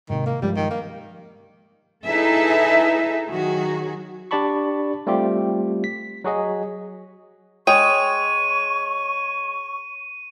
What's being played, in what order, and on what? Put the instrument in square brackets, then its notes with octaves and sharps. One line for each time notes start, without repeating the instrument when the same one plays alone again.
[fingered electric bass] G#2 C3 [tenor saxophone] D#3
[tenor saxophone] A#3
[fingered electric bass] G2 F3 G#3 [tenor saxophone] G3
[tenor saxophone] D#3
A#3
[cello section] D#4 E4 G#4 A4 B4 E5
D#3 F#3 F#4 G#4
[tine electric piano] D4 G4 D5 A5 B5 C#6
G3 A3 C4 F4 G4
B6
F#3 F#4 G#4 D#5
[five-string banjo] G#3 G5 [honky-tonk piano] C#5 [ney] C#6 [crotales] D#7